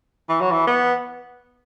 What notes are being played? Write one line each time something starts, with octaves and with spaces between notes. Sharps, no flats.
E3
F#3
E3
B3